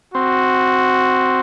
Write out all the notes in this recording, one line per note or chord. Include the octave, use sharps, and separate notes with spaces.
C4 F#4